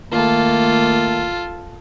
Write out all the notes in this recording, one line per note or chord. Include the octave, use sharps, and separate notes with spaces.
D#3 A3 A#3 F4 A4